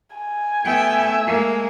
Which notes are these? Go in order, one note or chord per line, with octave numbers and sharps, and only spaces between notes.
G#5
A3 B3 E5 G5
G#3 A#3